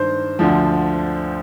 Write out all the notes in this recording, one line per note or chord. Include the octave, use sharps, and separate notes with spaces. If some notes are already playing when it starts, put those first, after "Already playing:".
Already playing: G2 D#3 C5
D2 D3 F3